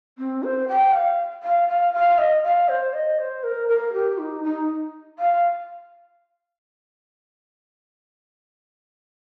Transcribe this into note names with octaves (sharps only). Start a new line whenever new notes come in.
C4
C5
G5
F5
F5
F5
F5
D#5
F5
C5
D#5
C5
A#4
A#4
G4
D#4
D#4
F5